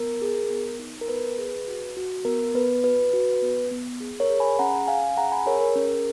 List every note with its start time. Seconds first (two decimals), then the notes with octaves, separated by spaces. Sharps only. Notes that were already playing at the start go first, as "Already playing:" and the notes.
Already playing: B3 A#4
0.22 G#4
0.50 B3
0.79 D#4
1.01 A#4
1.09 B3 B4
1.38 G#4
1.68 F#4
1.97 F#4
2.25 B3 A#4
2.54 B3 B4
2.84 F#4 B4
3.13 F#4
3.42 B3
3.71 B3
4.01 G#4
4.20 A#4 C#5
4.30 G#4
4.40 G#5 B5
4.59 C#4 F#5 A#5
4.88 C#4 F5 G#5
5.17 G#4 F#5 A#5
5.32 G#5 B5
5.46 G#4 A#4 C#5
5.61 A#4
5.76 C#4